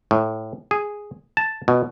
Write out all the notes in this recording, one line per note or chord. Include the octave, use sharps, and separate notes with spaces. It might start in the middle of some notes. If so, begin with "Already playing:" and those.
A2
G#4
A5
B2